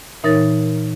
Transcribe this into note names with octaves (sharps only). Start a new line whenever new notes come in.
A#2 E3 D#4 A#4 C#5 A6